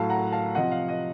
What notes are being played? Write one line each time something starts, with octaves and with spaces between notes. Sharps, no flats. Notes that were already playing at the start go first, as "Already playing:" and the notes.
Already playing: A2 F#3 F5 A5
F#5 A#5
F5 A5
C3 F3 D#5 F#5
F5
D#5